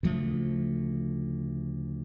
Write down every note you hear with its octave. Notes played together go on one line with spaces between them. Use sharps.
D2 C#3 F3 A3